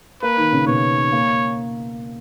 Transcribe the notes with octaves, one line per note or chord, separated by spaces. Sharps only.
A#3 A#4 B4
D#3 D#4
C#3 C#4
B2 B3 C#5
A#3